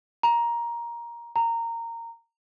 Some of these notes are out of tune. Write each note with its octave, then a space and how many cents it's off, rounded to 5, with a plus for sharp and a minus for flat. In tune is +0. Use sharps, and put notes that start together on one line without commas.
A#5 +10
A#5 -15